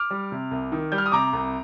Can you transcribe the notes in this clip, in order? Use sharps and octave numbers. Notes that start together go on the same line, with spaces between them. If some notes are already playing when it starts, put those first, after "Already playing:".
Already playing: D6 F6
G3
C3
C2
D#3
G3 G6
F6
D#6
C3 A#5 D6
C2